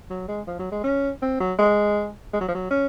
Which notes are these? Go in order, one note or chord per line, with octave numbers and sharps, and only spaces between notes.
F#3
G#3
F3
F#3
G#3
C#4
C4
F#3
G#3
G#3
F#3
F3
F#3
C#4